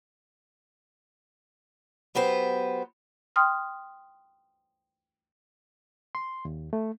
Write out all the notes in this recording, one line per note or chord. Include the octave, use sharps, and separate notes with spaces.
F#3 B3 G4 B4 C5
G5 C6 D#6 F6
C6
D#2
A3